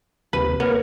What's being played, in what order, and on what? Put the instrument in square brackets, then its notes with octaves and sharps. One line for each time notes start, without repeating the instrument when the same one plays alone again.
[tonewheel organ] D#2 C3 [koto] B4
[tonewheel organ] A#3 A#4 C#5 [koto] B3